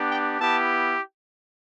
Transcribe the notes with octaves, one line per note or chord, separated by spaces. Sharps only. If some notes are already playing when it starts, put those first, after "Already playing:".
Already playing: B3 D4 G4
G5
B3 E4 G4 A5